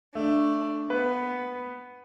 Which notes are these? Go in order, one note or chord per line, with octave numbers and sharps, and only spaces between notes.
A3 D4
B3 B4